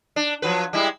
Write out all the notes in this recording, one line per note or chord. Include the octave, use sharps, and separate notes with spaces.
D4
F3 F#3 B4
G3 G#3 E4